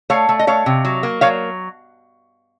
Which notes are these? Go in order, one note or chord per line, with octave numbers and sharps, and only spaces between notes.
A3 C#5 F5
A3
D#5
A3 C#5 F5
C3
F#3
A#3
F#3 C#5 F5